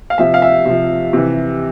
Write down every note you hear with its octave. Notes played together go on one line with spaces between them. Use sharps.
F5
C3 F3 E5
F5
E5
C3 F3
C3 E3